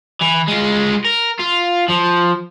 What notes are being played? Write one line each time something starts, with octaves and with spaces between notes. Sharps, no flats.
E3
G#3 F4
A#4
F4
F3